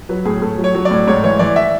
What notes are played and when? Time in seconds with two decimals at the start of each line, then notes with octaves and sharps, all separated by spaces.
0.09 F#3 B4
0.25 A2 G#4
0.41 A2 A4
0.58 F#3
0.64 C#5
0.75 F#3
0.85 D5
0.91 A2
1.07 G#2 C#5
1.24 E3 C#5
1.39 E3 D5
1.56 E5